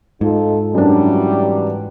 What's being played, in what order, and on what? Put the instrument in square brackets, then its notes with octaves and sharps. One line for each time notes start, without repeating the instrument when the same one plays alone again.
[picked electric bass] G#2 [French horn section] D#4 F4 A4
[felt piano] F#2 D4 [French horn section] E3 F#3 G3